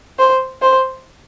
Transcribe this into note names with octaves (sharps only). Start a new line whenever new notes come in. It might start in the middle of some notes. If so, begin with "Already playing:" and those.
C5
C5